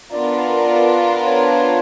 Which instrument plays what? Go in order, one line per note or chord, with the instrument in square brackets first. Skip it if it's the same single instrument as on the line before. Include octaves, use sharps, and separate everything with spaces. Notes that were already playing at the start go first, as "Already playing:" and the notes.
[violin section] B3 D4 F4 A#4 [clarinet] D5
[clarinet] C#5